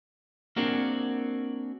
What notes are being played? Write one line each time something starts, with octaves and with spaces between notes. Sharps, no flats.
A#3 C4 D4 F#4 G#4 A#4